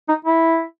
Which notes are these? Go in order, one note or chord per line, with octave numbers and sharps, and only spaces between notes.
D#4
E4